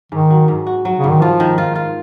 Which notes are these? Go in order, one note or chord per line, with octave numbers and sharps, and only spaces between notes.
G#2 D#3
F#3
G#2
F#4
F#3
G#2 C#3
D#3
F3 F4
D#3
F4
F4